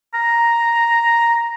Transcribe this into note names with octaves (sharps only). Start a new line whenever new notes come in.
A#5